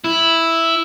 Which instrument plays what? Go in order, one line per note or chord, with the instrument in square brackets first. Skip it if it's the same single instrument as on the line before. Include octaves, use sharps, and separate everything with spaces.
[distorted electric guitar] E4